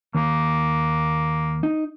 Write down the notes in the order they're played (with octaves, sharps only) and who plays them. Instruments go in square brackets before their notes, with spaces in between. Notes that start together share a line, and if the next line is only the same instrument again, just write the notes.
[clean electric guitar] D#2 [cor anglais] A#3
[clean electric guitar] D#4